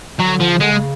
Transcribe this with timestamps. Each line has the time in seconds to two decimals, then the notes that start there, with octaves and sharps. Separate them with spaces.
0.19 D3 F#3
0.41 F3
0.50 C#3
0.61 D3 G#3
0.72 C#3